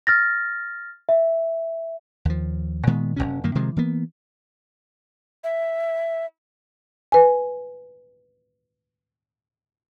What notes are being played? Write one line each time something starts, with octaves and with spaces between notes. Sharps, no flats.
F6 A6 A#6
E5
D#2 F3
A#2 D#3 G#3 B3
F#1 C2 C3 C#4
G2 D#3 A#3
C3 D#3 F3 G#3
E3 A#3 B3
E5
B4 G#5